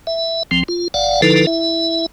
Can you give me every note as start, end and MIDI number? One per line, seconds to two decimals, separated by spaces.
0.07 0.43 76
0.51 0.63 36
0.51 0.63 53
0.51 0.63 60
0.68 0.88 65
0.94 1.21 31
0.94 1.21 74
0.94 1.21 77
0.94 1.21 78
1.22 1.46 50
1.22 1.46 53
1.22 1.46 63
1.22 1.46 64
1.22 1.46 69
1.22 1.46 71
1.47 2.06 64
1.47 2.06 76